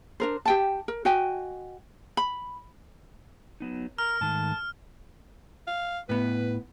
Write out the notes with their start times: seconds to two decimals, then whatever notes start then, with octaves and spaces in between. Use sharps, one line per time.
0.20 D4 A#4 C5
0.45 G4 G5 A5
0.88 A#4
1.05 F#4 D#5 G5 G#5
2.17 B5
3.60 F#3 B3 D#4
3.98 A#4 A#5 F6
4.21 G#2 D#3 A3 A5
5.67 F5
6.09 A2 B3 B4